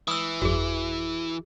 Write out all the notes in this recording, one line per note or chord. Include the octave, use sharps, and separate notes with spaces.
E3 D#6 E6
G1 F2 F#4 G#4